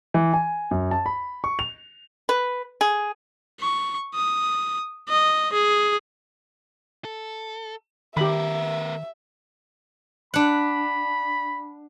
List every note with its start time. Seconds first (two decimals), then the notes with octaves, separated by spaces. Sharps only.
0.14 E3
0.34 G#5
0.71 F#2
0.91 A5
1.06 B5
1.44 C#6
1.59 F7
2.29 B4
2.81 G#4
3.60 C#6
4.15 D#6
5.09 D#5
5.53 G#4
7.05 A4
8.17 D#3 B3 G4 A#4 E5 B5
10.34 D4 F#5 B5